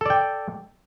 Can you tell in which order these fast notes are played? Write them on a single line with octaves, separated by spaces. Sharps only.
A4 D5 G5